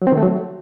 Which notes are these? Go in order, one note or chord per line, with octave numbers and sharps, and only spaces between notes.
F#3
C4
D#3
A3
F#3